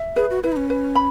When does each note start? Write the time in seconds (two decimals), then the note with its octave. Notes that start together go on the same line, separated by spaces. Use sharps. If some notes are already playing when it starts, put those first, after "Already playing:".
Already playing: E5
0.16 G#4 B4
0.30 F#4
0.43 E4 B4
0.52 D#4
0.57 C#4
0.70 B4
0.95 B5